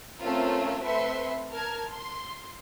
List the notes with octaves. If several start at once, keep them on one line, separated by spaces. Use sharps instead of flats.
A3 C4 C#4 F4 A#4 E6
A3 C4 B4 E5 C6 C#7
A#4 A5 F6 G#6
C6